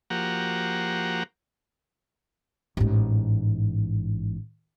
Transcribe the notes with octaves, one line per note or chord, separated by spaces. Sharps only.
F3 A#3 F#4 G4 F#5 A#5
A1 G#2